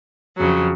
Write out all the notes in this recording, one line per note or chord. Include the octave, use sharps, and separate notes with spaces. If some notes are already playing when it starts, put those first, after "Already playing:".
F2 C#3 F#3